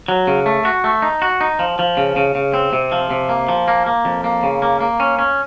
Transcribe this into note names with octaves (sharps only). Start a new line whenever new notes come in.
F#3
C#3
A3
F#4
A3
D#4
F#4
D#4
F3
F3
C#3
C#3
C#3
C4
C3
F3
C3
A#3
F3
A#3
A#3
F2
A#3
C#3
A#3
A#3
C#4
C#4